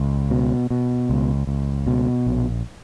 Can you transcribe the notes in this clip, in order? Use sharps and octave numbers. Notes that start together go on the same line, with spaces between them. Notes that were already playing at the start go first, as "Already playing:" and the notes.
Already playing: C#2
B2
B2
C#2
C#2
B2
A#1